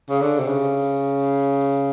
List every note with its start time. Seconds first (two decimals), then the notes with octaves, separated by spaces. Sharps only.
0.10 C#3
0.21 D3
0.39 C3
0.48 C#3